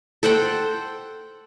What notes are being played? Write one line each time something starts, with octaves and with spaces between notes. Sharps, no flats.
A4 C5 F#5 G5